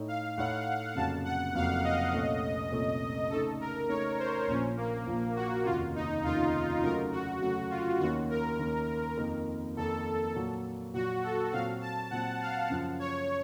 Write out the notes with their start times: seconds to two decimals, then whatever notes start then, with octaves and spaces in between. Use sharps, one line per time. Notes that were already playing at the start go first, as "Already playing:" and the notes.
Already playing: A2 A3 D#4 A4 C#5
0.08 F5
0.37 A2 A3 D#4 A4 C#5 F#5
0.95 F1 F2 C#3 F#3 A#3 A5
1.25 F#5
1.55 F1 F2 C#3 F#3 A#3 F5
1.84 D#5
2.13 C2 A#2 A3 C#4 A4
2.72 C2 A#2 A3 C#4 A4
3.31 C#3 A3 D#4 A4
3.61 A#4
3.89 C#3 A3 D#4 C#5
4.19 C5
4.48 A#1 A#2 F3 C#4
4.77 A#3
5.07 A#1 A#2 F3
5.36 F#4
5.65 F1 D#2 C#3 F4
5.95 D#4
6.24 F1 D#2 C#3 F4
6.83 C#3 F#3 A3 A#4
7.12 F#4
7.41 C#3 F#3 A3 F#4
7.70 F4
8.00 D#2 D#3 A#3 C#4 F#4
8.30 A#4
8.59 D#2 D#3 A#3 C#4
9.17 F2 D#3 A#3 D#4 A#4
9.76 F2 D#3 A#3 D#4 A4 A#4
10.35 A#2 F#3 A#3
10.94 A#2 F#3 A#3 F#4
11.24 A4
11.52 A#2 F#3 C4 F5
11.81 A5
12.11 A#2 F#3 C4 F#5
12.41 F5
12.70 F#2 C#3 F3
12.99 C#5